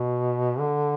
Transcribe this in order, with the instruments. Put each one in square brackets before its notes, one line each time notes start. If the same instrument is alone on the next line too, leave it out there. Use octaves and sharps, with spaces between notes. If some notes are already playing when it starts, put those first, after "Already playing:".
Already playing: [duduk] B2
D3